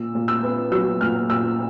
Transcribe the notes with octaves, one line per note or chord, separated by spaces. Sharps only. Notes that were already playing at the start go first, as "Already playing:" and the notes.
Already playing: A#2 E6
A#2
E6
B3
F#3 E6
A#2 F6
A#2 E6